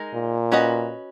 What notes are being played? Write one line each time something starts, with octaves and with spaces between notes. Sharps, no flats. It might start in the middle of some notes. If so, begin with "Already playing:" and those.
Already playing: G#3 D#4 A#4
A#2
C#4 F#4 B4 D#5